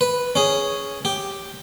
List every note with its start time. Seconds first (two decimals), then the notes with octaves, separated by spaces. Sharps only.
0.01 B4
0.36 C#4 G#4
1.05 G4